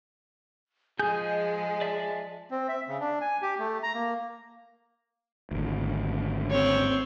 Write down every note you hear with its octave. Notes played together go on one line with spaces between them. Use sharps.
F3 G#3 G#4 D#5 G#5 G6
D5 E5 A5
C4
E5
C#3
D4
G#5
G4
A3
A#5
A#3
G#1 D2
C4 C#5